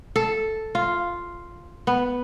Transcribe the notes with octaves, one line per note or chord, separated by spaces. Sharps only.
A4
F4
B3